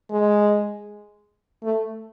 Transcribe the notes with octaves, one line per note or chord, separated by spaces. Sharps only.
G#3
A3